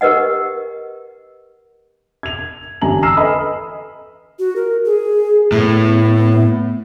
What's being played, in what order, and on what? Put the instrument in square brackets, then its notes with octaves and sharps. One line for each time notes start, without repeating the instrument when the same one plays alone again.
[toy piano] G4 A#4 B4 D#5 F#5
[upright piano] G#6 F7
A1 D3 G#5 A#5 F#7
G#5 A#5 E6 F6 C7 E7
A4 B4 D#5 B5 D#6
[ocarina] F#4
A#4
G#4
[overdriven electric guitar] A2 [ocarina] B3